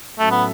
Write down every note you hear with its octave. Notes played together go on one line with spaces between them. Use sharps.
A2 F#3 A3 C#4 A4 E5
B3